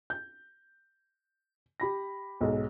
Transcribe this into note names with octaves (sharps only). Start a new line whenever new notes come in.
G6
G4 B5 A#6
B1 G#2